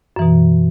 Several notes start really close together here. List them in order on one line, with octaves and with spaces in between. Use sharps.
F#2 E3 B2